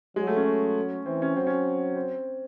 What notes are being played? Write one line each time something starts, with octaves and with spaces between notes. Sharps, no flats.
F#3 G#3
A3
C#4
F#3
E3 C4
C#4
F#3 C4
C#4
C4